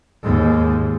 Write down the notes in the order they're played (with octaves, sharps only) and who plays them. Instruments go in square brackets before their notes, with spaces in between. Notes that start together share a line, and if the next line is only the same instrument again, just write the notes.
[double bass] D#2 G#2